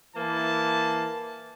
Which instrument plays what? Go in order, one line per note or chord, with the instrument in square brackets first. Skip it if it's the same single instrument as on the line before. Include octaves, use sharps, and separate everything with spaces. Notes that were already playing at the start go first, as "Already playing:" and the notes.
[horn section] E3 A#3 A5